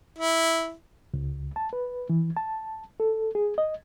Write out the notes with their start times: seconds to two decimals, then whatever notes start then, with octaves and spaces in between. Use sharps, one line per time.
0.19 E4
1.14 C#2
1.56 A5
1.73 B4
2.09 E3
2.37 A5
3.00 A4
3.35 G#4
3.58 D#5